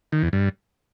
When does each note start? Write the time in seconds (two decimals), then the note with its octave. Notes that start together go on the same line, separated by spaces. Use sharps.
0.12 D#3
0.23 E2
0.33 G2